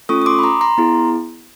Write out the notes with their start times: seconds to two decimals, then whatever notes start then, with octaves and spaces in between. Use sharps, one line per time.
0.09 A3 C#4 F4 A4 C#6 D#6
0.22 D#6
0.26 C6 D6
0.39 B5
0.43 A#5 C6
0.61 A#5 C6
0.78 B3 E4 G#4